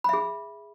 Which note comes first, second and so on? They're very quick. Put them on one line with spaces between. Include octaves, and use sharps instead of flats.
B5 E5 G#4